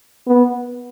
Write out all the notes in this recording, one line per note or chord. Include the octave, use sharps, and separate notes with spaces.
B3